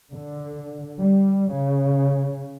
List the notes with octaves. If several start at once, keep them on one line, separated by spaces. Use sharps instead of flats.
D3
G3
C#3